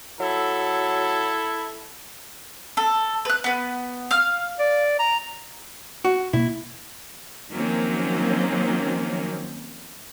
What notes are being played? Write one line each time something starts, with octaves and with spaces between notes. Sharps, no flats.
F#3 E4 A4
A4
B4 F#6
B3 B4
F5 F6
D5
A#5
F#4
B2 A#3 E4
D#3 F3 F#3 A#3 C4 C#4